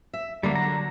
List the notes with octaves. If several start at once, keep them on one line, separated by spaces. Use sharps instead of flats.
E5
D3 F#3 G3 A#3 D4
A#5